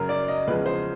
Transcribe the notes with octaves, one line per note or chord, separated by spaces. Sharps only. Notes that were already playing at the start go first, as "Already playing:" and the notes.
Already playing: F#2 C#3 F#3 A#4
D5
D#5
E2 C#3 F3 G#3 B4
C5